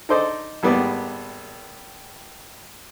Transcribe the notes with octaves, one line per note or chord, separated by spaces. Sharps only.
D#4 A4 C5 D5 D#5
G#1 G3 A#3 B3 D5